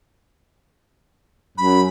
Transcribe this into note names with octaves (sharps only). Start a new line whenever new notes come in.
F#2 B5